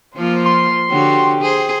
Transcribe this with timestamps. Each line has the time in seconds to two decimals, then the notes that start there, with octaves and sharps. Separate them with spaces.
0.16 F3 A#3 F4 C5
0.46 C6
0.90 D3 F#4 G4 C#5
1.41 G#4 C5